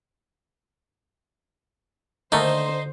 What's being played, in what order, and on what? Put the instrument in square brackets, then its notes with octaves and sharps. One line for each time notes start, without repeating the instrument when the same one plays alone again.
[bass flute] D3 [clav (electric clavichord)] D#3 A3 A#3 [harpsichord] D#4 [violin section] C5